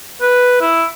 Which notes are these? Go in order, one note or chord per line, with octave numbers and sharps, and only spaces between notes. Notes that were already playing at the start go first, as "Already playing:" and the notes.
B4
E4